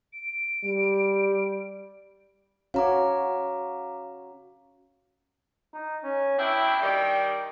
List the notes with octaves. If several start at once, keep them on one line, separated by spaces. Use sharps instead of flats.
D7
G3
C#4 F#4 C#5 F5 A#5 D6
D#4
C#4
B2 D4 E4 G5
D#3 G3